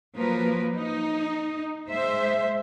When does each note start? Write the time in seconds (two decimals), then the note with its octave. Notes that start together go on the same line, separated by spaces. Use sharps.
0.16 F3 F#3 A#3 A#4 B4
0.75 D#4
1.89 G#3 C5 E5